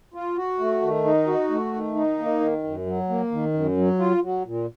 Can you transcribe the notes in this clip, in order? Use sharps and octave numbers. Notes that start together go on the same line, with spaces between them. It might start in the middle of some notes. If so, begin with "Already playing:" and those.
F4
F#4
A3
D#3
D#4
F#4
A3
D#3
D#4
A#3
D#3
F#2
F#3
A#3
D#3
F#2
F#3
F4
F#3
A#2